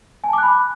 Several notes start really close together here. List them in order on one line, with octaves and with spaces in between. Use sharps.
G#5 A5 D6 F#6 B5